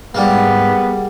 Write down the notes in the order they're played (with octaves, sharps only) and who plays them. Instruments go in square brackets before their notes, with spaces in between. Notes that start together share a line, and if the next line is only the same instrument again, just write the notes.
[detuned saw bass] G#2 [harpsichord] G3 A#3 [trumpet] B3 [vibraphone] G#4 F#5